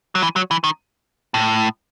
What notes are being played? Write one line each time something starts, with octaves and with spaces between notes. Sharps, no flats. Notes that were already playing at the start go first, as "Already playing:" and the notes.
F#3
E3
F#3
E3
D#3
A2